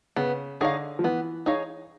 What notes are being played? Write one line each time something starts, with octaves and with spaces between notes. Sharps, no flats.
C#3 B3
D3 D#4 G#4 C#5 F5
F3
E3 B3
D#4 G#4 C#5 F5